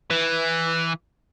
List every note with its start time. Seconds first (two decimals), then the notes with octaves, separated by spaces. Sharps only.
0.10 E3